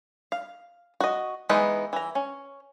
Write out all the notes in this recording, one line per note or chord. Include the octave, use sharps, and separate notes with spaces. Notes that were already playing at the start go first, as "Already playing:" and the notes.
F5
F#4 D#5
E3 G#3 B3 D#4 B4
E3 A#5
C#4